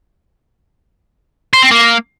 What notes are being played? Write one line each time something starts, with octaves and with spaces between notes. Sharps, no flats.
C5
C4
A#3